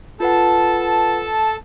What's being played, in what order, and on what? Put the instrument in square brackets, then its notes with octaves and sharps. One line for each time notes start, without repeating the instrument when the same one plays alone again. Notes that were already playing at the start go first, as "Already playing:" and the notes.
[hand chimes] F4 B4 F#5 [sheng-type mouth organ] A4 A5